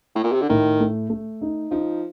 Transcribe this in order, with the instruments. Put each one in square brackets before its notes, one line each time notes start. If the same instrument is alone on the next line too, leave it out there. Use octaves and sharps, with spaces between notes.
[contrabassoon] A2
A#2
C3
D3
[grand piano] A2 [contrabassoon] D#3
[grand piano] A3
A3
D#4
[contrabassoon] F3 [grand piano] D#4